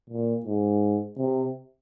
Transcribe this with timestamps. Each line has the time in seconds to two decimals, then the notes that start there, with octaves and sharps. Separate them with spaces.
0.10 A#2
0.46 G#2
1.18 C3